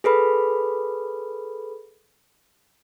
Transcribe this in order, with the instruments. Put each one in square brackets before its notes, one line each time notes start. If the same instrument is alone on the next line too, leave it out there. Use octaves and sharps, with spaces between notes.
[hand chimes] G#4 A4 B4 B5